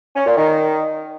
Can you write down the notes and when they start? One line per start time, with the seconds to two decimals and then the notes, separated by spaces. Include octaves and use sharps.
0.16 C#4
0.26 A#2
0.37 D#3